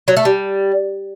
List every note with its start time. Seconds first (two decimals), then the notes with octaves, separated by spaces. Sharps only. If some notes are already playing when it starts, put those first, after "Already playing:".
0.08 F#3
0.17 A3
0.25 G3